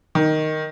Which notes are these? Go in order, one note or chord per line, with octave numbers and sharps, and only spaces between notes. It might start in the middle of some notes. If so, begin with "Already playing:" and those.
D#3